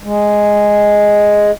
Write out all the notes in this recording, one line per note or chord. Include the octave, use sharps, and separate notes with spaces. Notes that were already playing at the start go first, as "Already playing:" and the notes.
G#3